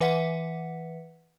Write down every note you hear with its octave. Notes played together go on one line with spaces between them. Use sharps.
E3 B4 E5 F#5 B6 C#7